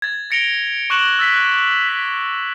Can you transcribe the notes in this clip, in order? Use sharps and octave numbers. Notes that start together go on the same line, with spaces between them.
G#6 A6
A6 A#6 C#7 D7 F7 G7
C#6 D6 F#6 C#7 E7 F#7
E6 A6 B6
F#6
B6